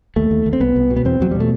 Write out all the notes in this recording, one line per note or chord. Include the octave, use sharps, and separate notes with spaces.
D#2 A3
D#2
D#2
C4
C2 B3
C2
B2
B3
E2 C4
E2 F#3
B2 G3
A3